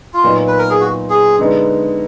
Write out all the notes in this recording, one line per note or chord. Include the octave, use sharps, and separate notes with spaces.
F4
A#2 F#3 B3 D#4
B4
A#4
G#4
F#4
G#4
D3 G#3 B3 D#4